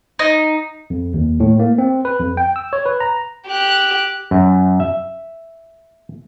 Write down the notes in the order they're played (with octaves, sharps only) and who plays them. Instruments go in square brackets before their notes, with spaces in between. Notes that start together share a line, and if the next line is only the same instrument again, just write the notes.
[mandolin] D#4
[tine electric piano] F2
D#2
A2
A#3
C4
B4
F2
G5
E6
C#5
B4
A#5
[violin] G4 F#6
[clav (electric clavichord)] F#2
E5